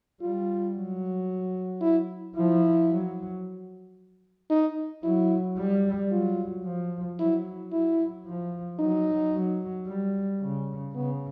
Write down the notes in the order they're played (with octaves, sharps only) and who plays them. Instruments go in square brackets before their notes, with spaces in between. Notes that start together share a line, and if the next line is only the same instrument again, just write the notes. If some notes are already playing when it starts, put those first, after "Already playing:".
[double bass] G3 [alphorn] F4
[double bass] F#3
[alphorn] E4
[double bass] F3 [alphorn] E4
[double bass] F#3
[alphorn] D#4
[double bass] F#3 [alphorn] E4
[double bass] G3
[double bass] F#3 [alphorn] F4
[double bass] F3
[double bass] F#3 [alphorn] E4
[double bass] F#3 [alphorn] E4
[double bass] F3
[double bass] F#3 [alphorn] D#4
[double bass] F#3
G3
C#3
[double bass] C#3 [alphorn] B3